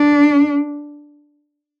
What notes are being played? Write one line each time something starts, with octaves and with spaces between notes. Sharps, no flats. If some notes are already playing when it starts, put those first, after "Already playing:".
Already playing: D4